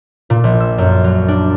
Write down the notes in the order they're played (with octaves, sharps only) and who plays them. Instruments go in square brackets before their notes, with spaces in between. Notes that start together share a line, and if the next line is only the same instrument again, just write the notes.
[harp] A#2
A#1
E6
F#2
F#3
D4